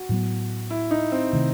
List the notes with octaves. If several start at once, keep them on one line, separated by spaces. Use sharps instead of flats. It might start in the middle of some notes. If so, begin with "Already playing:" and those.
Already playing: F#4
A2 F#3 B3
E4
D#4
C4
C3 D#3 A3